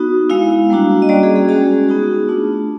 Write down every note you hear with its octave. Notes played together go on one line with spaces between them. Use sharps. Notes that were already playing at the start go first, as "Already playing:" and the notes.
Already playing: B3 D#4 F#4
G#3 B3 E4 F5
G3 A#3 D4 F#4
D#5
G3 A#3 C#4 F#4 D5
G#4
G#4
G#3 C#4 F#4 G#4
B3 D#4 F#4
A3 D4 F4